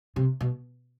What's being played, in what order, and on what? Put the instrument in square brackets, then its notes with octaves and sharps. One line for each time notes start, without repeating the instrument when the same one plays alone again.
[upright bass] C3
B2